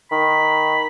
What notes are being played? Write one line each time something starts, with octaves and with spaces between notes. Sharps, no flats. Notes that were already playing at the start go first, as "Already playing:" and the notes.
D#3 B5